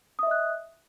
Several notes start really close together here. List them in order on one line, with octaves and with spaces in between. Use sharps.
D#6 E5 D#5 F#6